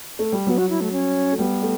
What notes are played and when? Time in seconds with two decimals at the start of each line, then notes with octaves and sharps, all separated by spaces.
0.19 A3
0.32 G3
0.47 F#3 B3
0.58 F#4
0.69 E4
0.81 A3
0.93 C#4
1.32 A3
1.39 G3 B3
1.62 A3